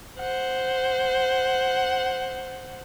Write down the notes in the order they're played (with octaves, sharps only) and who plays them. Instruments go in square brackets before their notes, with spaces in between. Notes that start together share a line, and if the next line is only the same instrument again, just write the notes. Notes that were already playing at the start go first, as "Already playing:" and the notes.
[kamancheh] C5 F#5